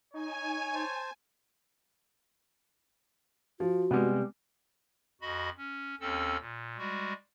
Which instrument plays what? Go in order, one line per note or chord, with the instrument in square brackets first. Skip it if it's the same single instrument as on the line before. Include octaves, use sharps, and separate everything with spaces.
[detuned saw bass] D#4 [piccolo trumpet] C#5 [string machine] G#5
[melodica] C5 A5
[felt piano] F3 [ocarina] F#4
[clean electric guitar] C3 G3 [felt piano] G#3 B3
[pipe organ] F2 F#4 D#5 B5
C#4
D#2 C4 C#4 A4 E6
A#2
G3 G#3 F#4